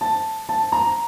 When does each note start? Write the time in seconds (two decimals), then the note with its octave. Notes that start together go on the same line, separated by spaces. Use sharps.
0.01 A5
0.49 A5
0.72 A#5